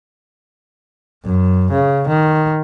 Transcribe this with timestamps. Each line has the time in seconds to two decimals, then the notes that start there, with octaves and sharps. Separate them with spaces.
1.25 F#2
1.72 C#3
2.08 D#3